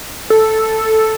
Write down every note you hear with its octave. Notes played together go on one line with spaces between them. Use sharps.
A4